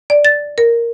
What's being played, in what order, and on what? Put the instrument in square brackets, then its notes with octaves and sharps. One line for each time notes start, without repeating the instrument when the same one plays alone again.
[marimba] D5
A6
A#4